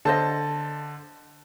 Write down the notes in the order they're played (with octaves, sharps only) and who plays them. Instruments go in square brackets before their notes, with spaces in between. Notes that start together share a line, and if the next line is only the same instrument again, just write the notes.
[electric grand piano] D3 A5 [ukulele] A4 C5 D#5